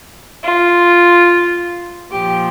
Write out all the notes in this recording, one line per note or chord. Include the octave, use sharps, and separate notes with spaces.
F4
A#2 F3 G4